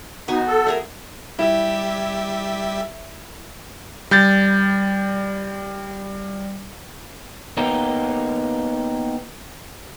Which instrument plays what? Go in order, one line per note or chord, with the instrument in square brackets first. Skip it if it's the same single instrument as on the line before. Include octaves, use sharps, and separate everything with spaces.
[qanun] B3 F#4 G#5 [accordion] D#4
[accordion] A4
[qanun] A3 G#4 A#4
[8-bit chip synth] G3 G4 E5 [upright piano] E4
[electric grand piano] G3 G6 A6
[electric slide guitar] A#3 B3 D#4 G4